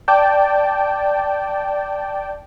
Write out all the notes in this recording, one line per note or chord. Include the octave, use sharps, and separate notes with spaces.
D5 G5 A5